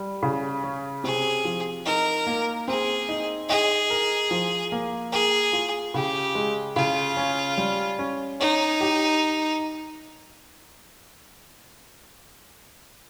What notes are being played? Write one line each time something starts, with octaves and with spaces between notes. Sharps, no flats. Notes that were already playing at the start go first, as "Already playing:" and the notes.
Already playing: G3
C#3
C#4
C3 G#4
F3
D#4 A#4
A#3
C4 G#4
D#4
G#4 D#5
A#4
F3
A#3
G#4 A#4
F4
C#3 G4
G#3
C#3 F4
C#4
G3
C#4
D#4 C#5
G4